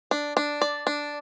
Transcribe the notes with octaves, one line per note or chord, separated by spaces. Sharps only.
D4
D4
D5
D4